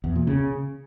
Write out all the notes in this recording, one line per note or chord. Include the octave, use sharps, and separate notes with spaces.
E2
A#2
C#3